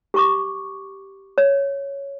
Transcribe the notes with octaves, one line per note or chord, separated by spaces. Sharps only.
G4 C#6 D6
C#5